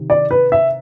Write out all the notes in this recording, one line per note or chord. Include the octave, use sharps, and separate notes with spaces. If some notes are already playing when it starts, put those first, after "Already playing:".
Already playing: C3 D#3
D5
B4
E5